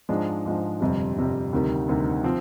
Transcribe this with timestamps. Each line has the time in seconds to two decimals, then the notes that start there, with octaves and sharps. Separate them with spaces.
0.09 G#2 F3 G#3 D4
0.46 G#2 F3 G#3 D4
0.80 G1 F2 C3 G3
1.17 G1 F2 C3 G3
1.53 D2 C3 D#3 G3
1.89 D2 C3 D#3 G3
2.24 F3 C4